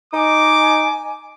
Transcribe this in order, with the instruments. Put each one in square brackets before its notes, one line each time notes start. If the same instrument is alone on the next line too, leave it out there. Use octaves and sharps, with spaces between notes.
[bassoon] D#4 [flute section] D#5 G#5 [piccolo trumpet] D6